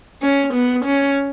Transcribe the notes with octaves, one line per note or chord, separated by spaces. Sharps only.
C#4
B3
C#4